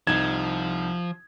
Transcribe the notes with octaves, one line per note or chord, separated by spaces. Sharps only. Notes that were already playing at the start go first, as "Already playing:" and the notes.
C2 F3 D#4 G#6 E7